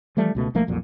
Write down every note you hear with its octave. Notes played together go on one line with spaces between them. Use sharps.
E3 F3 G3 A3
C#2 B2 A3
B1 F3 A3 A#3
B1 F2 A#2 F#3